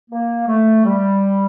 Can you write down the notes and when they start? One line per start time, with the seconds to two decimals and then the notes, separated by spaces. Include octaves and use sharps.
0.10 A#3
0.47 A3
0.85 G3